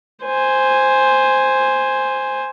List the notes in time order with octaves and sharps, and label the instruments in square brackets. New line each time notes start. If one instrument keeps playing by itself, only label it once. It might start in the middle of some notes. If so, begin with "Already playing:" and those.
[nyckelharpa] C5 G#5